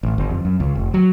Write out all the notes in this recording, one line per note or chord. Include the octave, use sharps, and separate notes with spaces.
A1
G1
F2
F#2
C#2
F1
F#3